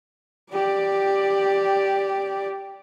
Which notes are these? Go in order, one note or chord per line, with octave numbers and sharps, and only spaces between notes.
G4 D5